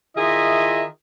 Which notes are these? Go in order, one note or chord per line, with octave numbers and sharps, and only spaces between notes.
D#3 E4 F4 G#4 D#5 E5